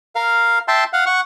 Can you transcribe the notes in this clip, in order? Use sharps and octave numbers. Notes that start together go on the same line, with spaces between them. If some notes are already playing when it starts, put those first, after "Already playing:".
A#4 F5
E5 G5 A5 C6
F5 F#5
F#5 C#6